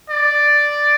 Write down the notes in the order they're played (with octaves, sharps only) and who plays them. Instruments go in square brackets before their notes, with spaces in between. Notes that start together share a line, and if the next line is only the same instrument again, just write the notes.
[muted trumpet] D5